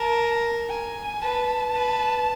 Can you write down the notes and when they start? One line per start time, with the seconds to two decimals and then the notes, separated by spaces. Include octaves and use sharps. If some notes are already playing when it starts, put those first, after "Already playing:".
Already playing: A#4 A5
0.69 G#5
1.21 B4 A5
1.74 B4